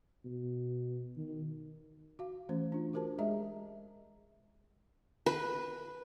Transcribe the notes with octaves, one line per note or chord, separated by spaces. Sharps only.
B2
D#3
F#4 F5
E3 A3 C#4 C5
D4 F4
F#4 G4 A#4 C5 A5
G#3 G#4 D#5 E5 A#5
B4